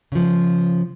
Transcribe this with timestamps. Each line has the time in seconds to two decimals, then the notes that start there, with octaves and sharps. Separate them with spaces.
0.12 C#3 F3